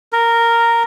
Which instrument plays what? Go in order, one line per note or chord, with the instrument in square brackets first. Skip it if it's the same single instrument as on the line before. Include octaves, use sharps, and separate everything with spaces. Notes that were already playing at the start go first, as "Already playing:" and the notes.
[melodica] A#4